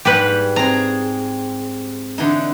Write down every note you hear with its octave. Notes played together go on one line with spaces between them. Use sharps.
G#2 G3 G4 B4
C4 G#4 A#5
D3 E3 D#4